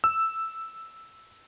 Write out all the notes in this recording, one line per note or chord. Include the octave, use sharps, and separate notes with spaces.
E6